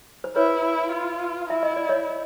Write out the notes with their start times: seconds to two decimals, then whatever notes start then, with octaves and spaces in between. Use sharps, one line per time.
0.24 C5
0.36 E4 B4 C#5
0.65 E4
0.93 F4
1.50 E4 E5
1.63 D#5
1.76 D5
1.89 C#5 D#5